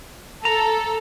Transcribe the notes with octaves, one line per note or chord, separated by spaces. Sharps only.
A4 A#5